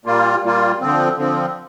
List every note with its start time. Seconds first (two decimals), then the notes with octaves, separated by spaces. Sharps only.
0.05 A#2 G3 A#3 F4
0.42 A#2 G3 A#3 F4
0.80 D3 F3 C4
1.17 D3 F3 C4